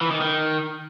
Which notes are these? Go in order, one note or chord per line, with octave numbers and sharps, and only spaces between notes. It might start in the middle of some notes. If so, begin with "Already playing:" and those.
E3
D#3
D#3